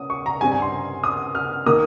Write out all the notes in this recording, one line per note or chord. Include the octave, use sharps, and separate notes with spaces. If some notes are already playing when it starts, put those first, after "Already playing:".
Already playing: C#4 D#6
C#6
A#5
G2 G3 C4 G#5
G#5
C6
D#6
F6
D#3 A#3 D#6